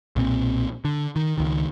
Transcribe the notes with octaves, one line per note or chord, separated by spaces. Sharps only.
B1 A#2 C4
D3
D#3
C#2 D#3